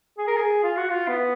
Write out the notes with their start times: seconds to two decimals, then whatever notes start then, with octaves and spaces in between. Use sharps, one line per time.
0.18 G#4
0.27 A#4
0.36 G#4
0.63 F4
0.77 F#4
0.90 F4
1.08 B3